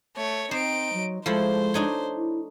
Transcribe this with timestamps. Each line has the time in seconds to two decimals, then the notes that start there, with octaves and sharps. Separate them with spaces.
0.16 A3 C#5
0.51 C4 D#4 C5 D7
0.93 F#3
1.26 F3 G#3 A3 E4 C5
1.74 D4 D#4 C#5
2.15 E4